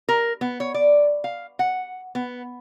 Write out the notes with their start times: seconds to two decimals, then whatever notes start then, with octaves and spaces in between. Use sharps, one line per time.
0.09 A#4
0.41 B3
0.60 C#5
0.74 D5
1.24 F5
1.59 F#5
2.15 B3